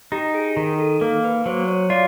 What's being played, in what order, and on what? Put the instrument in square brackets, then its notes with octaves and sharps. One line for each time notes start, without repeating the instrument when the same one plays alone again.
[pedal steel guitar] D#4 [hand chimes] G4
[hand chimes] G#4
[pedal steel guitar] D#3 [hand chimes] A#4
[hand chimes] A4
[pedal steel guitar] A#3 [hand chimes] A#4
[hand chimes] B4
[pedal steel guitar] F#3 [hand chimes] C5
[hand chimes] C#5
[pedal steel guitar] F4 [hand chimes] D5